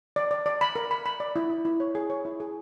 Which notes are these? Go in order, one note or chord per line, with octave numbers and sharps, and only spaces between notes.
D5
D5
D5
B5
A#4
B5
B5
D5
E4
E4
E4
C#5
G#4
C#5
E4
G#4